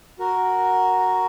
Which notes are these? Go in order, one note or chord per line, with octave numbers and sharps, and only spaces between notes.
F#4 A#4